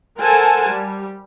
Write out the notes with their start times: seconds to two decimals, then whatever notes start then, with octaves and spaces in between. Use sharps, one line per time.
0.20 A4 A#4 C5 F#5 G#5 A5
0.69 G3